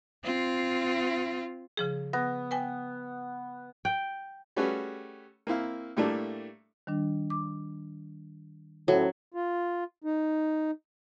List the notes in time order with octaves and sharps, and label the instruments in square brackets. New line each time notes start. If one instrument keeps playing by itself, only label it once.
[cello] C4 F4
[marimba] C#3 F3 G#4
[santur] B3 [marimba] A#6
[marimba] B4 G5 G#5
[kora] G5
[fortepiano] G3 A3 C#4 F#4 G#4 B4
A#3 C4 E4 F5
A2 G3 A3 A#3 D4
[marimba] D#3 G3 D4
D6
[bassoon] A2 [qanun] F#3 [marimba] C#4 C5 F#5
[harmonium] F4
D#4